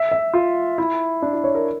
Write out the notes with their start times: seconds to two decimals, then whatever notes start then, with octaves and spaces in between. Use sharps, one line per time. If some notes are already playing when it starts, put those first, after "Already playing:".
Already playing: E5
0.11 E5
0.34 F4
0.78 E4
1.22 D4
1.33 E4
1.44 C#5
1.55 A#4